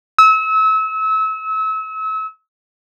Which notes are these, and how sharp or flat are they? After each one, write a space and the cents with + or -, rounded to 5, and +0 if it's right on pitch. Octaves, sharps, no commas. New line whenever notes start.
E6 -35